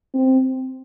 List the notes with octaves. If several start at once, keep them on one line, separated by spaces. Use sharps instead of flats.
C4